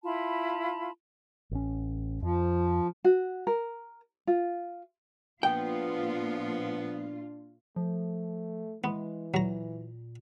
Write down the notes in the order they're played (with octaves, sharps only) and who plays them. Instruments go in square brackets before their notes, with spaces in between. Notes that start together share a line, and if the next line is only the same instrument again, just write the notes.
[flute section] E4 F4 A5 B5
[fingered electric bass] A1 C#4
[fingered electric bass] F2 [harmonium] F3
[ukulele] F#4
A#4
F4
[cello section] A#2 F4 [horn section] F3 B3 [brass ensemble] D4 [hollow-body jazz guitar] G5
[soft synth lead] F3 [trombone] A3
[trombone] E3 [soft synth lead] G#3 [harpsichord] B3
[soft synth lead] A#2 [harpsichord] F#3 A#5